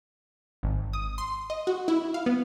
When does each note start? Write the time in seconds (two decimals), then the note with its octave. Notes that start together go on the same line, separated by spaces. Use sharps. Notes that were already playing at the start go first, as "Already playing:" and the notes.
0.63 G#1
0.93 D#6
1.18 C6
1.50 D#5
1.67 F#4
1.88 E4
2.14 F5
2.26 B3